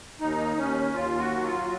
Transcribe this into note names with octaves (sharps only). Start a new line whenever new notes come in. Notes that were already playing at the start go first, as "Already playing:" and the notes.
D#2 D#4
D#2 C#4
D#2 F4
F#4
F#3
F4